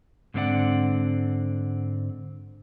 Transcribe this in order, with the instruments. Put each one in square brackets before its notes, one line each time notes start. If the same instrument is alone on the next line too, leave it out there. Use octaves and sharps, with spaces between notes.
[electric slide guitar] G#2 D3 C4 E4 D5 F#5